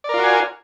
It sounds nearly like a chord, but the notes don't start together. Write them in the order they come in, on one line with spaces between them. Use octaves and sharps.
D5 A#4 F4 F#4 G#5